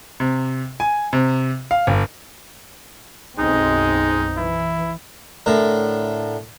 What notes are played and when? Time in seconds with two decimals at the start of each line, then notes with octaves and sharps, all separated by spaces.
0.20 C3
0.80 G#5
1.13 C3
1.71 F5
1.87 G1
3.39 B1 F#2 G#3 C4 D#4
4.37 E3 E4
5.46 A2 D3 A#4